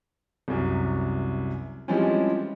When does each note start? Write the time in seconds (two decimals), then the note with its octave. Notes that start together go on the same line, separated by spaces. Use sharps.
0.48 C2 F#2
1.88 E3 F3 G3 G#3 C4 C#4